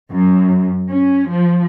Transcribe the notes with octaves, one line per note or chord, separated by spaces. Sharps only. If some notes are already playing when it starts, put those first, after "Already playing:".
F#2
C#4
F3